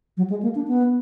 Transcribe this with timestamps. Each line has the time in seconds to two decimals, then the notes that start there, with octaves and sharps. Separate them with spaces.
0.17 F#3
0.30 G#3
0.43 A#3
0.55 D4
0.68 B3